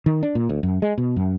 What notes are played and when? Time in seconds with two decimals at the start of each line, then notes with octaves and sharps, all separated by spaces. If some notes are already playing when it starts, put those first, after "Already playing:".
0.06 D#3
0.23 D4
0.35 A#2
0.49 D2
0.63 F#2
0.82 G#3
0.98 B2
1.16 F#2